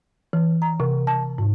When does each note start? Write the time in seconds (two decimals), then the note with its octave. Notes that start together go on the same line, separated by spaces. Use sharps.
0.33 E3
0.62 A#5
0.80 C3
1.07 A5
1.38 G#2